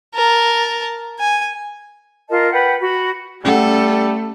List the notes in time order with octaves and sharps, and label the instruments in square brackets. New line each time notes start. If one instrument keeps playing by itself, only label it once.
[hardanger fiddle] A#4 A5
G#5
[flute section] F4 A#4 D#5 A5
B4 F#5 G5
F#4 B5
[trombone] G3 [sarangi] A3 [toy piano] C#4 F#5 [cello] A4